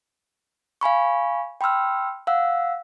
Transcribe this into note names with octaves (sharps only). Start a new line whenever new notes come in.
F5 G#5 B5 C#6
G5 B5 C6 E6 F6
F5 F#5 E6